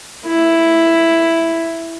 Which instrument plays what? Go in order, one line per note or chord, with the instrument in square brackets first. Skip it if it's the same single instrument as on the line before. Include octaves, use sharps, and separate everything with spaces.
[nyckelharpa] E4